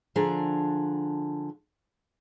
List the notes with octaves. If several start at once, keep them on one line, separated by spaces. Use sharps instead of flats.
D3 F3 D4 G#4 A#5